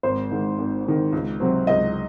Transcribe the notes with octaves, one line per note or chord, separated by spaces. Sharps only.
G#1 C5
G#2 D#3
G#1
G#2 D#3
C#2
C3 F#3 C4
C#2 D#5